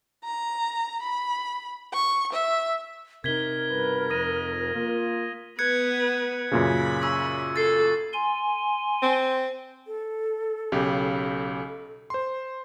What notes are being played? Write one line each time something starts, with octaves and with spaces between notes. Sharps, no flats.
A#5
B5
C#6
E5
C3 D#4 A#4 G#6 B6 G7
G2 B2 B4
F2 D#6 A#6 D#7
A#3 F4
B3 B4 F#6 G#6 C#7
F#2 A#2 C#3 B5
C#6 E6
A4 A6 C7
G#5 C6
C4
A4
B1 C#3 G4
C5 C6